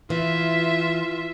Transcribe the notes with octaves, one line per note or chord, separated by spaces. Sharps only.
E3 F4 E5